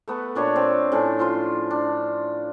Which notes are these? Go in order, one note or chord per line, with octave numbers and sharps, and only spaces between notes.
A3 B3 B4
A#2 D4 C#5 B5
C4
A2 C#4 D4 A4
F3 F4 C6
D4